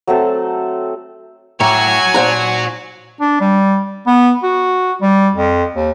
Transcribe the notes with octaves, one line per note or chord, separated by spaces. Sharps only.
F#3 A3 C4 A4
A2 F#4 C#5 G#5 A#5 D6
A#2 D#4 C5 F#5 A#5
D4
G3
B3
F#4
G3
F2
D#2